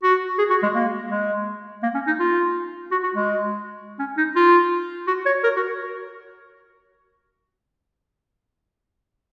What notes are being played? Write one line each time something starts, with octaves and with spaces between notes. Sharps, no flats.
F#4
G#4
F#4
G#3
A#3
G#3
A#3
C#4
D#4
F4
F#4
F#4
G#3
C#4
D#4
F4
F#4
C#5
A#4
F#4